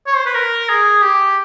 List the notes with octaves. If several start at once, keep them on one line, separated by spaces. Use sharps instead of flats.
C#5
C5
B4
A#4
G#4
G4